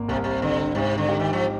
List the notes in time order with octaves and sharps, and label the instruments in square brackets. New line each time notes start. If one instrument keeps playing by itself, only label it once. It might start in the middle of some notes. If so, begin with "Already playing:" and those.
Already playing: [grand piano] G#1 A#3
[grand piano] C2 [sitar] C3
[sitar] C3
[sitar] D3 [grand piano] C4
[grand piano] G#2 [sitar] C3
[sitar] D3
[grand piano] G4
[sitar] D#3
F3